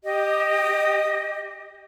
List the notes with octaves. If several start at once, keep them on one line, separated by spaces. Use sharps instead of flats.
G4 D#5